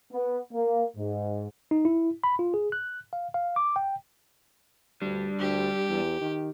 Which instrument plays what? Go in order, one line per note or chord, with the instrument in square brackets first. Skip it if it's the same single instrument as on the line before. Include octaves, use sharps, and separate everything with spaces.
[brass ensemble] B3
A#3
G#2
[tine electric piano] D#4
E4
B5
F4
G#4
F#6
F5
F5
D6
G5
[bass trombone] D2 [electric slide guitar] G3 D4
[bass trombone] D2 [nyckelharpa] G4
[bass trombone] E2
D#3